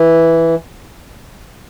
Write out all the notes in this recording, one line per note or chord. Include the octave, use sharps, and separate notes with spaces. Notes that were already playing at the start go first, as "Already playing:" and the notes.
Already playing: E3